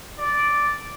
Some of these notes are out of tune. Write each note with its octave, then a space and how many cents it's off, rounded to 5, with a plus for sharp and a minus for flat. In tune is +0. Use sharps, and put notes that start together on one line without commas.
D5 -5